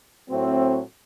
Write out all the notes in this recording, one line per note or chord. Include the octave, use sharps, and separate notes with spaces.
A2 F#3 A3 C4